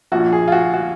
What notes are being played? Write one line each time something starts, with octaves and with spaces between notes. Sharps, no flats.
A#1 A#2 F3 F#4
G#4
F4
F#4
F#4